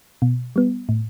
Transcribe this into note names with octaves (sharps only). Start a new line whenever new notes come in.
B2
G3 B3
A2